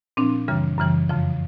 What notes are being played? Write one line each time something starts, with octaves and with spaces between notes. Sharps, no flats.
A#2 F3 C4 D4
F#2 C#3 E3 G3
F#2 C#3 E3 G3
F2 C#3 F3